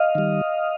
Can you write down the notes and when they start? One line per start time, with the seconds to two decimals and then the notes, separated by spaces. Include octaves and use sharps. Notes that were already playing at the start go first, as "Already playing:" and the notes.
Already playing: D#5 F5
0.15 D#3 G3